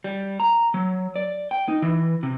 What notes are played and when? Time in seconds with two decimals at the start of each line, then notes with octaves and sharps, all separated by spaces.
0.04 G3
0.40 A#5
0.74 F#3
1.16 D5
1.51 G5
1.68 D#4
1.82 E3
2.23 C3